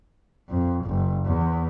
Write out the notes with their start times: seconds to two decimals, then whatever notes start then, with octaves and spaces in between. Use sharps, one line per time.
0.49 F2
0.85 F#1
1.26 E2